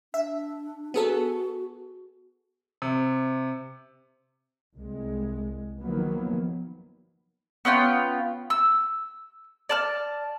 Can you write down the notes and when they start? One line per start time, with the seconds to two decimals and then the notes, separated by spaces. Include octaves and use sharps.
0.14 D4 E5
0.94 B3 F#4 G#4 A4
2.82 C3
4.75 C2 G#3
5.80 D#3 F3 F#3 A#3 B3
7.65 B3 C#4 F4 G5
8.50 E6
9.69 D5 A5 F6